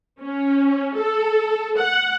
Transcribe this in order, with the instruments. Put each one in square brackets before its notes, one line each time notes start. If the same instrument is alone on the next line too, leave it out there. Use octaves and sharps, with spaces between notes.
[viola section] C#4
A4
F#5